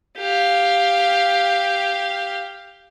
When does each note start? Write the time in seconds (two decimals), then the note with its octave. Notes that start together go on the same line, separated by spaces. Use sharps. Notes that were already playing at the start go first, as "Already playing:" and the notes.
0.18 G4 F5